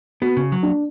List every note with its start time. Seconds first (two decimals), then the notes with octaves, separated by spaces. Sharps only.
0.21 B3 F#4
0.37 C#3
0.52 F#3
0.63 D4